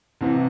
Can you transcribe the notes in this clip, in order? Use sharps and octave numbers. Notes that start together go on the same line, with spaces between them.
C2 C3 E3